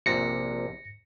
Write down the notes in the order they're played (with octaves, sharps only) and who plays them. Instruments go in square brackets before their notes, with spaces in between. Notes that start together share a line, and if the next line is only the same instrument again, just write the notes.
[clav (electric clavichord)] A#1 C3 [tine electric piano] A#6 C#7